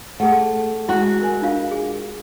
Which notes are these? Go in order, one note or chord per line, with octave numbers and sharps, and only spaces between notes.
A3 G#4 F#5
G#3 E4 F#4 C6
A#4 G#5
D4 F4 F5
G#4